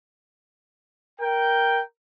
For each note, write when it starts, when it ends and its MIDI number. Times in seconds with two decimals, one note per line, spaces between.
1.20 1.81 70
1.20 1.81 79